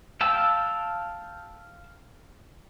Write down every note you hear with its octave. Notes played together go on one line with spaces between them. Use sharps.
F5 G5 A5 E6